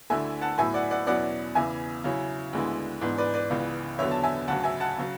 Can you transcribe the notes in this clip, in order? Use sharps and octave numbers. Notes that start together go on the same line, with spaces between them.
D2 D3 A3 E4 E5 G#5
F#5 A5
A2 F#3 B3 E4 E5 G#5
D5 F#5
D5 F#5
E2 B2 F#3 C#4 E4 D5 F#5
E2 C#3 E3 E5 G#5
C#3 F#3 C#4 E4
D2 D3 G#3 B3 E4
G#2 E3 B3 D4
B4 D5
B4 D5
C#2 C#3 E3 B3
E2 D3 F#3 B3 C#5 E5
A5
E5 G#5
D2 C#3 F#3 F#5 A5
E5 G#5
F#5 A5
C#3 F#3